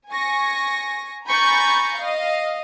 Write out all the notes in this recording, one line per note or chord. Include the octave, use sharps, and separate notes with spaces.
G#5 C#6 A#6
G#5 A#5 B5 C#6 G6 A6
D#5 F5